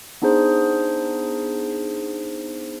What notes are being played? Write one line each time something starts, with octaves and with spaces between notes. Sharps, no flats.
B3 D4 D#4 G#4 C5